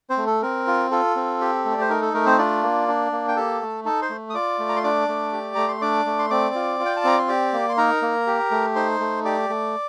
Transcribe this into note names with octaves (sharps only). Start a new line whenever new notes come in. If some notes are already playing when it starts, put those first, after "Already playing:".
C4 C5
A3
A4
C4 A#4
F4
F4 A4
C4
G4
A3
D5
C5
D#4 A#4
A4
A3 A#4
C4 C5
D4 F4 D5
A#3
D4
A#3
G5
G4 A4 A5
A3
D#4 A4 A5
C5 C6
A3
D#6
F4 D5 D6
A3
A#5
C6
D4 D5 D6
A3
G4
A3 A#5
C6
D4 D5 D6
A3
C6
C4 D5 D6
F4
F4
G5
A5
C4 A#5
C6
G4 D5 D6
A#3
C6
D#4 A#4 A#5
A#3
G4
A3
D#4 C5 C6
A3
G4 D5 D6
A3